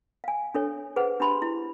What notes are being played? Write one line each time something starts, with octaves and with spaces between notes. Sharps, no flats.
F5 G#5
D4 A4 C#5
G#4 B4 C5 F#5
D4 G4 B5 C6
E4